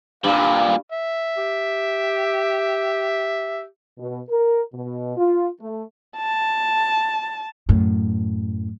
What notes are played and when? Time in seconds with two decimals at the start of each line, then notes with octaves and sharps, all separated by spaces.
0.24 G2 A#2 G3 F5
0.92 E5
1.38 G4
3.98 B2
4.29 A#4
4.73 B2
5.17 F4
5.60 A3
6.17 A5
7.69 F#2 A2